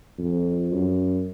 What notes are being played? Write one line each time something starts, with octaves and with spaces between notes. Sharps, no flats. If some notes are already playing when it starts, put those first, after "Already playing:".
F2
F#2